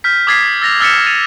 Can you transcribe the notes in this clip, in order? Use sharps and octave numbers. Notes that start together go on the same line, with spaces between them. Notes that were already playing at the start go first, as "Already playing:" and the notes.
F6 G6 B6
D6 D#6 G#6 A6 B6 C7
E6 A6 A#6 F7
E6 F6 A6 B6 C#7 E7
A6 C#7 D#7 F7